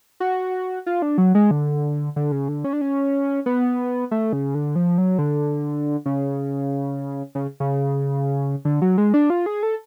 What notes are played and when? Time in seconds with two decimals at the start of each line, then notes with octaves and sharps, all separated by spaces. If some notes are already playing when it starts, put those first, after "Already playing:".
0.20 F#4
0.86 F4
1.02 D4
1.18 F#3
1.35 G#3
1.51 D3
2.16 D3
2.32 C#3
2.48 D3
2.64 C#4
2.73 D4
2.81 C#4
3.46 B3
4.11 A3
4.33 C#3
4.55 D3
4.76 F3
4.98 F#3
5.18 D3
6.06 C#3
7.35 C#3
7.60 C#3
8.65 D3
8.82 F#3
8.98 G#3
9.14 D4
9.30 F4
9.46 G#4
9.63 A4